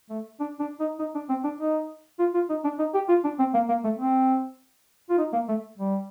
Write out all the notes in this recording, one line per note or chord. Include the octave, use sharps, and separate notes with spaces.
A3
D4
D4
D#4
D#4
D4
C4
D4
D#4
F4
F4
D#4
D4
D#4
G4
F4
D4
C4
A#3
A#3
A3
C4
F4
D#4
A#3
A3
G3